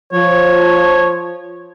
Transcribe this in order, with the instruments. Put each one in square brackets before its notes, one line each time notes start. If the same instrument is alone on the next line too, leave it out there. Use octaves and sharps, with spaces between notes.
[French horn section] F3 [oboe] C#5